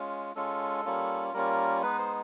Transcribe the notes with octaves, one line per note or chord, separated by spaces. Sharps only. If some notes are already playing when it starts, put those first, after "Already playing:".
Already playing: G#3 C#4 F4
G#3 C#4 F4 A4
G3 A#3 C#4 F4
G3 A#3 C#4 F4 A#4
G#3 B3 D#4 B4
C5